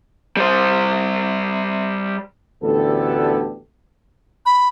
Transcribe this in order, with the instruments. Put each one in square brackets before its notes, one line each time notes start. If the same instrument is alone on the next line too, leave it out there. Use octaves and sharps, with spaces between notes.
[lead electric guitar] G3 C5
[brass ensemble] A1 D2 D3 B3 G4 A4
[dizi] B5